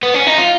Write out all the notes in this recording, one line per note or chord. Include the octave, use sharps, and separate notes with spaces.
B3
C#4
D#4
F4